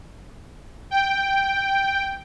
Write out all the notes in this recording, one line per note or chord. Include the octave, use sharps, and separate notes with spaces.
G5